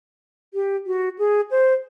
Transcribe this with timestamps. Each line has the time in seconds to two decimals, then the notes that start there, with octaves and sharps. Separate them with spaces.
0.54 G4
0.86 F#4
1.19 G#4
1.51 C5